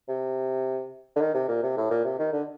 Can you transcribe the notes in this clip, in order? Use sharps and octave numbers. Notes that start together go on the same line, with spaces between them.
C3
D3
D#3
C3
A#2
C3
A2
A#2
C3
D#3
D3